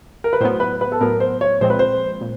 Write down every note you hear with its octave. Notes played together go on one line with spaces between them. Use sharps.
A#4
B4
A2 F#3 B3 C5
B4
B4
A4
A2 F#3 B3 A#4
C5
C#5
A#2 F3 G#3 C4 C5
B4
C5
A#2